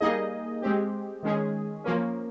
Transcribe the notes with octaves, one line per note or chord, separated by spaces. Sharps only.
G3 A#3 D#4 G#4 D#5
G#3 C4 G4
D#3 G#3 C#4 G#4
F3 A#3 C#4